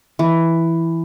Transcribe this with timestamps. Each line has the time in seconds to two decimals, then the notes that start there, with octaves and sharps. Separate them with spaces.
0.19 E3